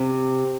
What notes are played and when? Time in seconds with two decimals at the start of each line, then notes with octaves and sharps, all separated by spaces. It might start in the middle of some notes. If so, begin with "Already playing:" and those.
Already playing: C3